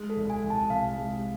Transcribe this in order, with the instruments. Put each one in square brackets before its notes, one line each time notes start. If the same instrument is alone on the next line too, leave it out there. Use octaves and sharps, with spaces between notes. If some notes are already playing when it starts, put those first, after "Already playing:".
Already playing: [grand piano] G#3
[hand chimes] A4
[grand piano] C2
[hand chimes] G#5
[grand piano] C2
[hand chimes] A5
[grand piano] C3 [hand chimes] F5
[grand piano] G#3